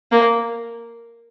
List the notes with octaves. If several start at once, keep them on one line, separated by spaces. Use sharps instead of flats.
A#3